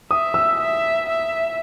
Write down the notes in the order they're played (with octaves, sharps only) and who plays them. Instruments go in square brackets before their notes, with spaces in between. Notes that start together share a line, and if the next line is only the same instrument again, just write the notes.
[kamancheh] E5 [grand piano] D#6
[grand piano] E6
[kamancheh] E5
E5